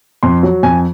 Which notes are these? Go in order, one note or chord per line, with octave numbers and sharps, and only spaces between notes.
F2 C6
F#3
F2 G#5